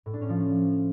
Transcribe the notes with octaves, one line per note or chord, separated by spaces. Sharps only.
A2
D4
C#4
F3